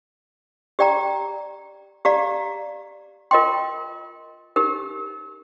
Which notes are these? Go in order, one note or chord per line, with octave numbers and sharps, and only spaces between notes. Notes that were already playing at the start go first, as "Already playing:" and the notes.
G4 D5 G5 A#5
G4 D5 F5 A#5
F4 A#4 D#5 G5 C6
D#4 G4 A#4